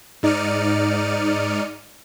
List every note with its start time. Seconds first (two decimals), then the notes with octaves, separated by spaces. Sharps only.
0.23 G#2 D#4 D5 F6 C#7 D#7